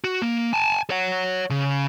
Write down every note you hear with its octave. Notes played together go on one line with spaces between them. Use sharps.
F#4
A#3
G#5 A5
C#5 F#5
C#3